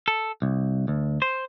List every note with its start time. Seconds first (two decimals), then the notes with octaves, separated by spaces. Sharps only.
0.08 A4
0.42 C2
0.88 D2
1.22 C5